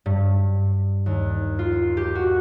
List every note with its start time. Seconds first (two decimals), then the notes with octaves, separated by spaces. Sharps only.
0.06 G2
1.06 D#2
1.59 F4
1.97 G4
2.15 F#4